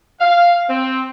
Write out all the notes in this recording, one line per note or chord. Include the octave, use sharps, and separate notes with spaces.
F5
C4